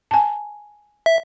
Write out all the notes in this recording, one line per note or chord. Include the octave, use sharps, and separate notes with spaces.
G#5 A5
E5